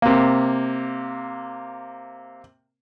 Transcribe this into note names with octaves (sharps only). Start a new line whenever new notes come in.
C3 A#3